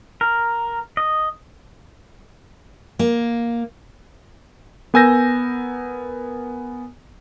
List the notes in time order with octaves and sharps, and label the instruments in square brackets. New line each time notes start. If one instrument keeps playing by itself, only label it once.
[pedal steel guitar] A#4
D#5
[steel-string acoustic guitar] A#3
[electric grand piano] B3 A#4 G#5 E6 G6 A#6